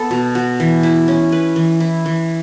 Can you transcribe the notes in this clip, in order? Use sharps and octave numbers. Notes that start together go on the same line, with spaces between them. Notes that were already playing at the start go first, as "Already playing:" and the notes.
Already playing: B3 A4
B2
F#4
E3
E4
C#4
B4
E3
E4
E3